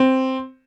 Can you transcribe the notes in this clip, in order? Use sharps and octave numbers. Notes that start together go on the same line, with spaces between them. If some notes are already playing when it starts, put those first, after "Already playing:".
Already playing: C4